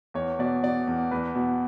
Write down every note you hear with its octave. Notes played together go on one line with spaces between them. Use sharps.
E2 C#5
B2 D5
B2 D5
E2
E2 B4
B2